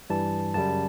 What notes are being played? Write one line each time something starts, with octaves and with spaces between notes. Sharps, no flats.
G2 E3 G3 A5
F#2 C#3 G3 A5